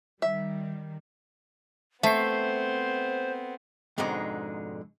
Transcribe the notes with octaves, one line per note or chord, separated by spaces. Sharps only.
D#3 G3 E5
A3 B3 C4 C5 E5 C7
F2 G#2 B2 D3 G#3 D#4